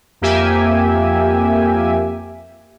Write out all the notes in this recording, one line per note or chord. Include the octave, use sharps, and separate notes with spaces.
F2 A#3 G4 E5 G#5